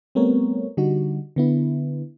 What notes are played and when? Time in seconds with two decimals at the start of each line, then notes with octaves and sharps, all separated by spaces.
0.15 G3 A3 B3 C4 A#4 C#5
0.77 D3 G3 D#4 F#4
1.36 D3 B3 E4